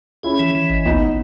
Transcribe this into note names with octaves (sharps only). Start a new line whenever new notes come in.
C#4 E4 G#4
E3
E3
G#1
C#2 B3 D#4